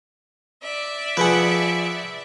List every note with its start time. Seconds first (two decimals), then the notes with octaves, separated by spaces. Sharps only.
0.62 D5 E5
1.17 F3 G#4 B4 F#5 G#5